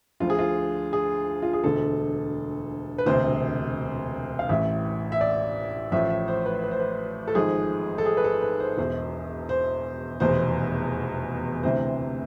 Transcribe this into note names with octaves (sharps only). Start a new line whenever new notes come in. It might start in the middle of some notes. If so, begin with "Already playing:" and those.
D2 D3 F3 F4
G#4
F4
G#4
F4
G#4
E1 D2 D3 A4
B4
E1 D2 C3 C5
F5
A1 A2 E3 E5
E5
D5
A1 A2 F3 E5
E5
C5
B4
B4
C5
B4
A4
G#1 G#2 F3 G#4
A4
G#4
B4
A4
B4
C5
E1 E2 B2 C5
C5
F1 E2 B2 C5
D2 C3 E3 C5